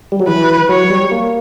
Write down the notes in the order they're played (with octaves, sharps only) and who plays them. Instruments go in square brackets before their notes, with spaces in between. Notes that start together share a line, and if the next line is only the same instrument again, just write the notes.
[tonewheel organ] G3
F#3
[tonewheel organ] E3 [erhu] B4
[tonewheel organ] F#3 [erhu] C#5
[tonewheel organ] G3
A#3